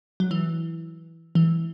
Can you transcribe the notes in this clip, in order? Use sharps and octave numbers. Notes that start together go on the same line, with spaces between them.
F#3
E3
E3